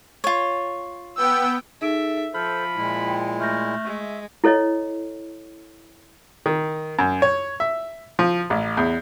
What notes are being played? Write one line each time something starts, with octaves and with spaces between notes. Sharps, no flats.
F4 C#5
B3 G5 E6
D#4 G#4 A4 E5 D7
F3 A4 C5 B5 F6
A#2 G#3 E4
G5
A3 F6 G6 A#6
G#3 E5 C#6
E4 A4 C#5 D#5
D#3
F#2
C#5
E5
F3
A1
E2